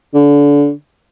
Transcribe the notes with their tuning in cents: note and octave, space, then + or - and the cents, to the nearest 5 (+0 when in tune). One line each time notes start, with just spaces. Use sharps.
D3 -30